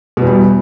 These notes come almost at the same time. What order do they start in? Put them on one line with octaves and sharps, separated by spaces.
B2 E2 G3